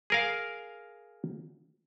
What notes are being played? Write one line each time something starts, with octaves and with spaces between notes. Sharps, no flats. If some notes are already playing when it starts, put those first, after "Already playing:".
G#4 A#4 F5